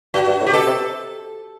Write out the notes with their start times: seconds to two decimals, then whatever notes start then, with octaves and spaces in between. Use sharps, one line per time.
0.14 G2 F#4
0.27 G2
0.41 A2
0.47 G4
0.53 B2 A4
0.66 C3